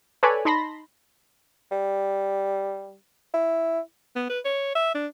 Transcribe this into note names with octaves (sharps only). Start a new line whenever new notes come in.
A4 B4 C#5 D5 G#5 B5
D#4 A5 B5 C6 A#6
G3
E4
B3
B4
C#5
E5
D4